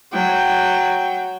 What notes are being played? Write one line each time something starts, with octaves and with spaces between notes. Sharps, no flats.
F#3 G5